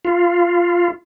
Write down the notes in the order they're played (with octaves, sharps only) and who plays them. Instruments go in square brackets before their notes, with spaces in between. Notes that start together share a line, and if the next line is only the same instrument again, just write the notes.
[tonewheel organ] F4